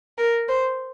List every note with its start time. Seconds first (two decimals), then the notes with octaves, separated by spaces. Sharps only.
0.18 A#4
0.48 C5